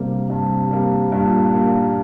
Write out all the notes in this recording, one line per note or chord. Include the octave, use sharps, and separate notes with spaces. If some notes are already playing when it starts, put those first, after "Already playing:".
Already playing: G2 C3 G3 A#3
G2
G3 A#3
G2 A#2
G3 A#3